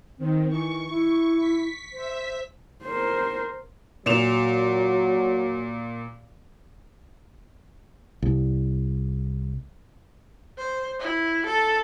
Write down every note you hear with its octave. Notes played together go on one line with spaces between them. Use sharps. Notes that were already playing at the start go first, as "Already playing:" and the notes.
D#3 C4
E3 C#6
E4
B6
C5 E5 B6
A#4 C5
A#2 F#3 E7 F7
C2
C5
E4
A4